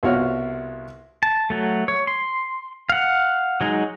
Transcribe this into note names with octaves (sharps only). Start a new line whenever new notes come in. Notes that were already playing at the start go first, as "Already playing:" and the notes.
C2 B2 F4 F#4 C#5 F6
A5
F#3 A3
C#5
C6
F5 F#5
F#3 G#3 D#4